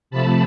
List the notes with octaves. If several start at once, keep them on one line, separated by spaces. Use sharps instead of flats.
C3 F3 A3 A5 B5